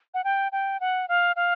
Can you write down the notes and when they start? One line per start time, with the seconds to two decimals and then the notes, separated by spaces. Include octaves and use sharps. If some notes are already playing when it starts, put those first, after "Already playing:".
0.14 F#5
0.24 G5
0.52 G5
0.80 F#5
1.09 F5
1.36 F5